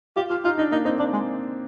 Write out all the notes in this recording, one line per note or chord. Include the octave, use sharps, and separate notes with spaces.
F4 G4
F4 G4
D#4 F4
D4 D#4
A#3 D#4
C4 D#4
A#3 D4
G#3